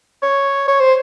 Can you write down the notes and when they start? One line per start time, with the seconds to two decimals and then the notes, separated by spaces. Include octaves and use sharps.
0.23 C#5
0.68 C#5
0.80 C5